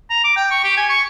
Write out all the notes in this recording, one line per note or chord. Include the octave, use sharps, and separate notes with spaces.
A#5
D6
G5
C#6
G4
G#5
C#6